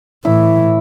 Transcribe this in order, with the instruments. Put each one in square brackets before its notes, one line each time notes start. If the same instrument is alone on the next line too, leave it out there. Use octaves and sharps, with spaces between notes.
[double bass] A2 E3 [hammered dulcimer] E4